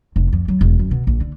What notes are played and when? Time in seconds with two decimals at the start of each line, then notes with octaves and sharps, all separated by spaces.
0.16 F1
0.32 F2
0.48 F#3
0.61 E1
0.79 F#2
0.91 B2
1.07 A#1
1.20 D3